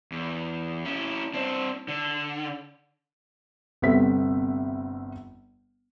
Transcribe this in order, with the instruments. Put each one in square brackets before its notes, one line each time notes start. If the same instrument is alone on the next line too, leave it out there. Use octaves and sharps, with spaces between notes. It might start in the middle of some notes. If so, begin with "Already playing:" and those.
[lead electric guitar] E2
C#4 E4
C4 D4
D3
[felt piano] G1 C3 B3 C4 E5 B6